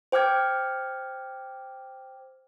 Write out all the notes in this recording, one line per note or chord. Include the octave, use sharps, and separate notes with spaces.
C5 G5 D6 F6 G#6